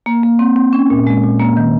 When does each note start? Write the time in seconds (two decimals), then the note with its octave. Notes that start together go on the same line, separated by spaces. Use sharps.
0.06 A#3
0.23 A#3
0.39 C4
0.56 C4
0.73 C#4
0.90 A#2
1.07 G#3
1.24 A#2
1.40 A#3
1.57 D#3